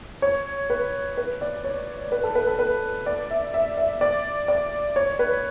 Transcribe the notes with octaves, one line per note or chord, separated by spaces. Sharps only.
C#5
B4
B4
D5
C#5
B4
A4
B4
A4
B4
D5
E5
E5
E5
D5
D5
C#5
B4